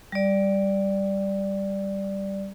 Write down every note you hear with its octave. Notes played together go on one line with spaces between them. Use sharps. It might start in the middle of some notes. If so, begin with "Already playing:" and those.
G3 D5